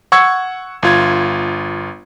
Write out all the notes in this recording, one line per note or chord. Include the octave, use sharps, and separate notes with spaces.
F#5 C#6 E6 G#6 C#7
G1 F4 G#6